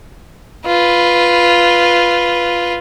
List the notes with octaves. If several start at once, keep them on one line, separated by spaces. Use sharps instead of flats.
F4 B4